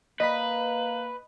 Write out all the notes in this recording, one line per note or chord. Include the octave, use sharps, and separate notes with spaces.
A#3 B4 D#5 B5 B6